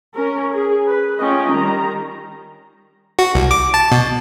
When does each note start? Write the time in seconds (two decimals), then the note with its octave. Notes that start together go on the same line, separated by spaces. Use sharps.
0.16 C#4 A#4
0.54 G#4
0.87 B4
1.19 A3 C#4 F4 D#5 G5
1.51 D#3 G3 A#5
3.19 F#4
3.35 C2
3.51 D6
3.74 A5
3.92 B2